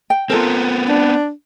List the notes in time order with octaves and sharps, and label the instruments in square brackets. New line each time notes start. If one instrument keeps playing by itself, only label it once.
[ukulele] G5
[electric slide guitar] B3 C4 [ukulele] F4 A4 A#4
[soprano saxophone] D4